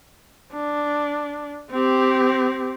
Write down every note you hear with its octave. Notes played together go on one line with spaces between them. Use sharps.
D4
C4 G4